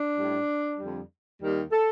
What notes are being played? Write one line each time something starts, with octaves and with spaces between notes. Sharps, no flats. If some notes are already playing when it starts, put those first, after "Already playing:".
Already playing: D4
A2 G3
F2 D3 G3
D#2 D#3 G3
A4